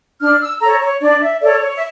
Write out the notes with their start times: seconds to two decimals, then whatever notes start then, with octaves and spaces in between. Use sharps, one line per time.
0.21 D4 F6
0.41 E6
0.61 A4 C#5 A#5
0.81 C#5
1.01 D4 D5
1.22 E5
1.42 A4 C#5 D5
1.61 C#5
1.76 E5